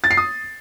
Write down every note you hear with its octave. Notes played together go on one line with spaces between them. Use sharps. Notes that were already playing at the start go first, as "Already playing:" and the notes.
A6
C7
D#6